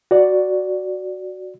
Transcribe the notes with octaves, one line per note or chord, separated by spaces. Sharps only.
F#4 D5